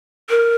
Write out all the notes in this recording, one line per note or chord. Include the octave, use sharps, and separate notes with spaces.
A#4